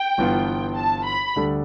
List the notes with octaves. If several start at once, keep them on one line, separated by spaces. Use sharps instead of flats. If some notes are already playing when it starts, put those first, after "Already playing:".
Already playing: G5
G1 G2 E3 B3 F4
A5
B5
D2 D3 G3 D4 A4